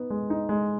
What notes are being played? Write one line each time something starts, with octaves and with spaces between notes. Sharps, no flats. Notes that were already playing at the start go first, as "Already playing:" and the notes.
Already playing: B3 D#4
G#3
D#4
G#3